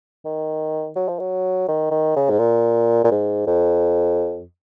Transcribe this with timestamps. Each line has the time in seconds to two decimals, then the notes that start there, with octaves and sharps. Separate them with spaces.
0.25 D#3
0.96 F#3
1.08 F3
1.19 F#3
1.68 D#3
1.91 D#3
2.16 C#3
2.30 G#2
2.39 A#2
3.05 A#2
3.11 G#2
3.47 F2